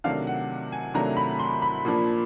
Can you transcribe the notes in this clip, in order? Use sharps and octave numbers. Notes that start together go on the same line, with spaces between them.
C3 D#3 F#3 A3 D4 F5
F#5
G#5
C3 D#3 F#3 A3 D4 A#5
B5
C6
B5
A#2 F3 A#3 D4